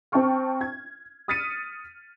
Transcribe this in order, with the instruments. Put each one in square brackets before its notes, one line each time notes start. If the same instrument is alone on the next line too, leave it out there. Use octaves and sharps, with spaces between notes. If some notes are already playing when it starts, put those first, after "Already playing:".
[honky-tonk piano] C4 G5 A5 C#6 F6
G#6
D#6 F6 A6 B6 C#7 D#7